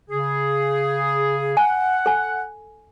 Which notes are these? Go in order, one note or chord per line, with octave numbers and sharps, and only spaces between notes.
C#3 G#4
F#5 G#5
A4 G#5